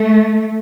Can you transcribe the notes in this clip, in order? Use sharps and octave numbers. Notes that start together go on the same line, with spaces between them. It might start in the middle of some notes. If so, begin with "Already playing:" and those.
Already playing: A3